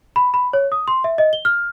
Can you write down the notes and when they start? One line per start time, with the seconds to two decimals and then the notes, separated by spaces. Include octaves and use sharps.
0.16 B5
0.34 B5
0.53 C#5
0.72 D#6
0.88 C6
1.04 E5
1.18 D#5
1.33 G7
1.45 F6